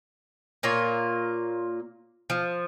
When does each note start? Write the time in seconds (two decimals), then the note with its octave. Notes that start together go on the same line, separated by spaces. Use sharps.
0.63 A#2 A#3 F4 C#5
2.30 F3